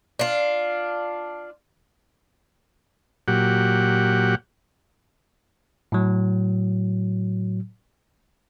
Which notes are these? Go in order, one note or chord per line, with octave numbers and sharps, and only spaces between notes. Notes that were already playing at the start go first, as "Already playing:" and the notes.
D4 F4
A#2 F#3 G4 F#5
A2 F#3